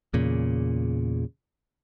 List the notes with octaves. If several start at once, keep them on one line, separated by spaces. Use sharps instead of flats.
E2 A#2 C#3